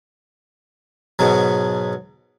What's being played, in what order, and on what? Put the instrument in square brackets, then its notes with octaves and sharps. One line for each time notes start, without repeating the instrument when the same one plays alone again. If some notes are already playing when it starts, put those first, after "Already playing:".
[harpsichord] G#2 B2 F#3